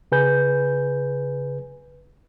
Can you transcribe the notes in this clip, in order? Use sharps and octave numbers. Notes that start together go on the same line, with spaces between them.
C#3 G#4 B4 G#5 G6